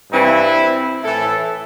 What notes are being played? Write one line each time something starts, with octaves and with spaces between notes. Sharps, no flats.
G2 E3 C4 E4
A2 E3 E4 A4